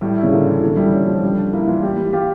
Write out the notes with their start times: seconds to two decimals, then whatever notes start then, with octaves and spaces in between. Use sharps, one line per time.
0.01 A2 G3
0.17 E4
0.23 C#3
0.32 D3 A#3
0.47 E3
0.62 A#2 D3
0.77 G3 E4
0.93 C#4
1.07 F3
1.22 C#3 G3
1.38 D4
1.52 A#3 E4
1.67 E3 F4
1.82 G3 G4
1.98 G3
2.13 F4 G4